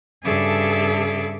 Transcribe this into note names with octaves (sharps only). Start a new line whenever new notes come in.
G2 C#3 G#4 A4 E5 D6